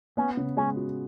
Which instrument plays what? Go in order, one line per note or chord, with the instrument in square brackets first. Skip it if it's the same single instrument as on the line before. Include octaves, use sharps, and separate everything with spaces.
[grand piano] B3 [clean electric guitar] C#4
[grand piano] C#3
[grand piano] G#3 [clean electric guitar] C#4
[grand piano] F#4